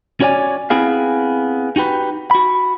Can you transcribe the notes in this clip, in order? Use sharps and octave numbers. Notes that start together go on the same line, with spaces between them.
C#4 F#4 C#5 D5 G#5
B3 C4 E4 G#4 F5
D#4 F#4 G4 B4
F#4 B5